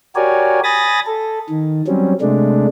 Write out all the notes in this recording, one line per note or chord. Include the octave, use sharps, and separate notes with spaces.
F#4 G4 A#4 C#5 D5 G#5
G#5 B5 D#6 A6 A#6
A4
D#3
F#3 G3 C4 C#4
C3 G#3 A3 D4